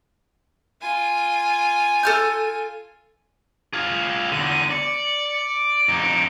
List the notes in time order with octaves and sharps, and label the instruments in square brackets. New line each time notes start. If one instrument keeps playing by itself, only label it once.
[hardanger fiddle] F4 G#5
[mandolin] A4 F6 G6
[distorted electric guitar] F4 G#4
[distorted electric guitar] E2 D3 [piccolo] D#7
[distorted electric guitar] D5 [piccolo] C#7
[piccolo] D7
[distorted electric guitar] F2 D#4